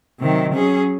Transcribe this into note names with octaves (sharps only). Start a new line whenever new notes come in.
C3 D#3 F#3
F#3 C#4 G#4